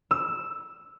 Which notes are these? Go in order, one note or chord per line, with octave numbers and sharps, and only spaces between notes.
E6